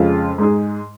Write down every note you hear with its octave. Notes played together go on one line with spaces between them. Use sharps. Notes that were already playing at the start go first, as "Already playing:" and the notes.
Already playing: F2 C#3 G#3 F4
G#2 G#3 D#4 G#4